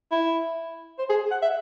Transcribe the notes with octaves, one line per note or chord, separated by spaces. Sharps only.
E4
C5
G#4
F#5
E5